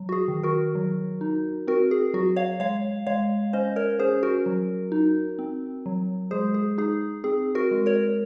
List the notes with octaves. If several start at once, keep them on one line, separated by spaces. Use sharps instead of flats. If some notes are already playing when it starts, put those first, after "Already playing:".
Already playing: F#3
F#4
G#4
D#3
F#4 A#4
F#3
D#4
C4 F#4 A#4
G#4
F#3 F#4
C#5 F5
G#3 C#5 F5
G#3 C#5 F5
C#4 C5 D#5
A#4 C#5
C#4 G#4 C5
F#4 A#4
F#3
D#4
C4
F#3
G#3 G#4 C5
G#4
D#4 G#4
C4 G#4
F#4 A#4
G#3
A#4 C#5